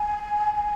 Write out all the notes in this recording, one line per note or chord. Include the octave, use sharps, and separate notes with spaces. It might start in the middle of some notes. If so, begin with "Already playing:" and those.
Already playing: G#5
G#5